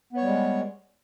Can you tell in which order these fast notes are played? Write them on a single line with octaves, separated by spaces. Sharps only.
B3 C#5 G3 G#3